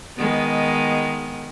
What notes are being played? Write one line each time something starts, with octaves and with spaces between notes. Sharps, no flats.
D#3 G#3 B3